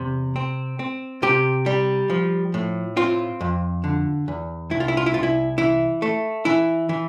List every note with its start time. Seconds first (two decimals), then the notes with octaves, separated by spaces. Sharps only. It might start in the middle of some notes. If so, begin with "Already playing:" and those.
Already playing: E2 C3
0.36 C4
0.79 C4
1.22 C3 G4
1.66 G3
2.10 F3
2.54 A2
2.97 C4 F4
3.41 F2
3.84 D3
4.28 E2
4.71 C2 E4
4.80 F4
4.88 E4
4.97 F4
5.06 E4
5.14 C2 F4
5.23 E4
5.58 E3 E4
6.02 A3
6.45 E3 E4
6.89 E3